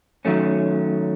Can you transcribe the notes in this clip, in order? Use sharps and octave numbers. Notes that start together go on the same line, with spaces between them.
D#3 F#3 A3 C#4